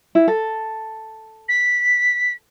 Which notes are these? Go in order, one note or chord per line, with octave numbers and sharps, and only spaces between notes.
E4
A4
B6